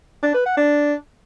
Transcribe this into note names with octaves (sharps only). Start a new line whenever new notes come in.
D4
B4
F#5
D4